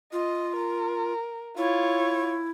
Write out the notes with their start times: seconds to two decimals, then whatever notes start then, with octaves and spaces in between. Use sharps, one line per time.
0.13 F4 D#5
0.56 A#4
1.57 E4 F4 C#5